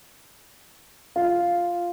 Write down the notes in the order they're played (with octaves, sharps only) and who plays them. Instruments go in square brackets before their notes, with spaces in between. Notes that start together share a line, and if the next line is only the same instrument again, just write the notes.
[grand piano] F4